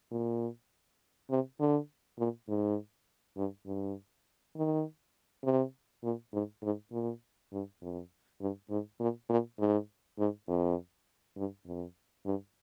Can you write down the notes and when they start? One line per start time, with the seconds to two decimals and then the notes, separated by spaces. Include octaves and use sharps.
0.11 A#2
1.30 C3
1.59 D3
2.19 A#2
2.48 G#2
3.37 G2
3.66 G2
4.56 D#3
5.44 C3
6.04 A#2
6.33 G#2
6.63 G#2
6.92 A#2
7.52 G2
7.82 F2
8.41 G2
8.70 G#2
9.00 A#2
9.29 A#2
9.59 G#2
10.19 G#2
10.48 F2
11.37 G2
11.66 F2
12.25 G2